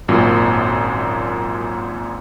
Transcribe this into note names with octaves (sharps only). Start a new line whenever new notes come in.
G#1 F#2 A#2